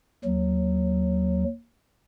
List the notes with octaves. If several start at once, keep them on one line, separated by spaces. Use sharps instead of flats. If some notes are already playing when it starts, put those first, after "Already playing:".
D#2 F#3